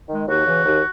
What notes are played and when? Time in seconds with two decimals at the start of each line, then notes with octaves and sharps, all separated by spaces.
0.09 D#3 G#3
0.27 D#2 F#4
0.45 C#3 E3
0.64 D#2